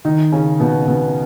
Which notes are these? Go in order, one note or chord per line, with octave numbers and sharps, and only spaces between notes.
D#3 D#4
C#3 C#4
B2 B3
B2 B3